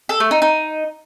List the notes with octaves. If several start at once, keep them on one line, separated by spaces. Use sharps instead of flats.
A4
A3
D#4
D#4